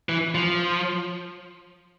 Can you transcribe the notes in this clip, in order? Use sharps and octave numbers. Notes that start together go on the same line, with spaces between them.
E3
F3